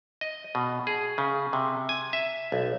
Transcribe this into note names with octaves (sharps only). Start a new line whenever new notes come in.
D#5
B2
G#4
C#3
C3
G#5
E5
B1